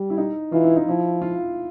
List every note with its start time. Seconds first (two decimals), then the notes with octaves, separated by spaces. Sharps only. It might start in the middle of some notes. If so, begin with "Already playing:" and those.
Already playing: G3
0.10 E4
0.17 D#4
0.52 E3 F4
0.64 E4
0.76 D#4
0.87 F3 E4
1.22 F4